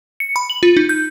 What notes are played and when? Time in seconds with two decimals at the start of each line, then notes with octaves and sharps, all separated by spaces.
0.20 C#7
0.36 B5
0.50 F#7
0.63 F4
0.77 D#4
0.89 G6